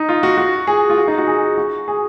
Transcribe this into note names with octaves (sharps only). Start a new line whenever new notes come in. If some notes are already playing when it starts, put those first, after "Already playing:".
Already playing: D#4
F4
F#4
F#4
G#4
F4
F#4
D#4
F#4
G#4
F#4
G#4